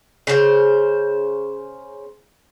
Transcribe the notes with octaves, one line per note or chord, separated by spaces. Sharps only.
C#3 C5